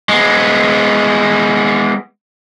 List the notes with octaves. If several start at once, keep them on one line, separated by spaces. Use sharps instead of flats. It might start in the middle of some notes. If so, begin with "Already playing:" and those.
G#3 B3